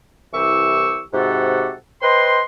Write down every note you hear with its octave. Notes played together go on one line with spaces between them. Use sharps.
C2 E3 G4 C#6 E6
G#2 C3 F#4 G4 A4 F#5
B4 C5 D#5 G5 C6